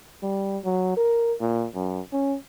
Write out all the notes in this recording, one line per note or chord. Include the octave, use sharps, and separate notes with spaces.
G3
F#3
A#4
A#2
F#2
C#4